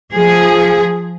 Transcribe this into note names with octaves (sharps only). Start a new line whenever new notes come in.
F3 G#4